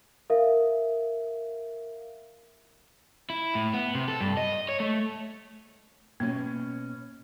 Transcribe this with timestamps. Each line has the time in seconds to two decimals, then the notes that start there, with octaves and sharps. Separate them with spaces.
0.30 A#4 E5 F5
3.30 E4
3.55 A2
3.74 B3
3.95 C3
4.08 A4
4.21 G2
4.37 D#5
4.69 C#5
4.80 A3
6.20 B2 A#3 C#4